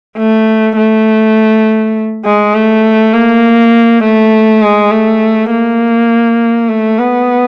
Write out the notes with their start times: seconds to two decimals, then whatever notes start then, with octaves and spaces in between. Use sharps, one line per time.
0.17 A3
0.77 A3
2.25 G#3
2.54 A3
3.14 A#3
4.03 A3
4.62 G#3
4.91 A3
5.51 A#3
6.69 A3
6.99 B3